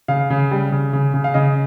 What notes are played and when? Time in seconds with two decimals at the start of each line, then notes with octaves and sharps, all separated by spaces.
0.08 C#3 F5
0.30 C#3
0.51 G3
0.72 C#3
0.93 C#3
1.14 C#3
1.24 F5
1.34 C#3 D#5